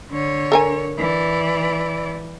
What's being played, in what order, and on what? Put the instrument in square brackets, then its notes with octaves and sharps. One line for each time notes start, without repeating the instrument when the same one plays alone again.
[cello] D3 C#5
[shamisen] A4 A#4 G#5
[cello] E3 D5